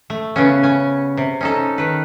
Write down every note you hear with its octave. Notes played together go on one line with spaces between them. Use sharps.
A3
C#3 B3 C#4
C#4 G#5
C3
C#4 D#4 A4
D#3 B4